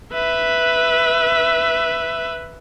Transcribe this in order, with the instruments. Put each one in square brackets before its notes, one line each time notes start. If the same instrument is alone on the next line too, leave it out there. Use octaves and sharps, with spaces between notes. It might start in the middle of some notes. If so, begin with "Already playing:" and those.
[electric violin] B4 E5